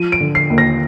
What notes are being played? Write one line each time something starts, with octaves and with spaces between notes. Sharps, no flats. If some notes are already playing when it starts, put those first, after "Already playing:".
Already playing: F3 D#7
D7
D3
C7
D#2
A#6